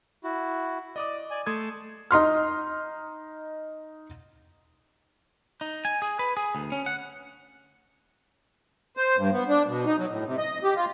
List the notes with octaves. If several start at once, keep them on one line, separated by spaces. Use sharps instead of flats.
E4 F#4
D5 D#5 D6 D#6
D5 G#5
A3 A5 C6 D#6 G#6
D#4 D#5 C6 F6
D#4
G#5
G#4
B4
G#4
D2
C#4
F#5
C5
G2
B3
D4
B2
D#4
F#3
A2
C3
D#5
G4
F4